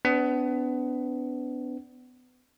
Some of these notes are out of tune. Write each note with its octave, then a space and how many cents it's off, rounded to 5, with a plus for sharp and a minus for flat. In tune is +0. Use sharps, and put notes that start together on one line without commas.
B3 +30 D4 -25